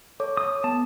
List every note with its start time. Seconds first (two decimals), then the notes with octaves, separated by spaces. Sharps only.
0.20 A4 C#5 D6
0.37 D#6
0.64 B3 A5